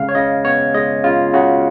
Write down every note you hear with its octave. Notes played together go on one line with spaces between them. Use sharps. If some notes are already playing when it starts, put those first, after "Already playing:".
Already playing: C#3 G#3 F5
C#5
C#3 D#5
B3 C#5
G#3 D#5
C#3 F4
C#3 F#4